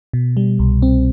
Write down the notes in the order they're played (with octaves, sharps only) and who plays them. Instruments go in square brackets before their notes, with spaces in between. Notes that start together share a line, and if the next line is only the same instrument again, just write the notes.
[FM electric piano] B2
G3
C2
C4